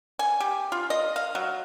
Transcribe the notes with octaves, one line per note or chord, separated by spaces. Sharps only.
G#5
G4
F4
D#5
F5
F#3